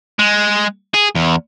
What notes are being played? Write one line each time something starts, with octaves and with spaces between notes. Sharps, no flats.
G#3
G#4
E2